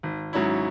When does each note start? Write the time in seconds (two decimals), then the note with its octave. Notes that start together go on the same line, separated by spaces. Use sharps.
0.03 G#1
0.33 G#2 F#3 C#4 E4